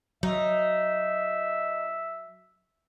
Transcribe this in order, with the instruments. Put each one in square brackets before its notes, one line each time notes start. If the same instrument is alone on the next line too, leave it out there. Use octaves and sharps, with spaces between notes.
[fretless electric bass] F#3 [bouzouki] D#4 [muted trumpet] E5